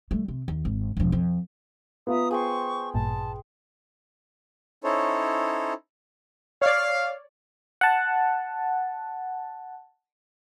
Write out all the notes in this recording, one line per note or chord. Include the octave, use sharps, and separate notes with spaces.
G3 A3
C3
D#2
G#1
E1 F3
F2
B3 F4 E5 A#5 D#6
G#4 C5 G5 C6 C#6
A1 G2 A#2 A5
C#4 D#4 E4 A4 C5 C#5
C#5 D5 F5
F#5 A5